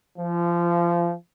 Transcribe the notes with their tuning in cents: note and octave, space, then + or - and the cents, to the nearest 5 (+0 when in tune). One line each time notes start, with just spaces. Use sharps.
F3 -25